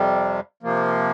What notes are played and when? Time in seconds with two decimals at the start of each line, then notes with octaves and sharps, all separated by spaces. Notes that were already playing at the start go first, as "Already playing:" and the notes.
Already playing: F2 C3 G3
0.63 C3 F3 A#3